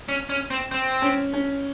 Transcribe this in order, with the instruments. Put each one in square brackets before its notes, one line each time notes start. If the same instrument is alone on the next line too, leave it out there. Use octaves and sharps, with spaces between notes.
[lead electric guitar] C#4
C#4
C4
C4
[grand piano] C#4
C#4